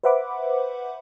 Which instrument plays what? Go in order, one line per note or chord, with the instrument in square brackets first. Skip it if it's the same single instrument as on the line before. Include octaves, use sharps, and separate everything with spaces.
[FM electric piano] B4 C5 E5 F#5 B5 D6